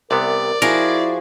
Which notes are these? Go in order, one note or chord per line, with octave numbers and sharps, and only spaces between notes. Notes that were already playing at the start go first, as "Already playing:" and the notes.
C2 C3 B3 A#4 D5
F3 E4 F#4 G#4 A#4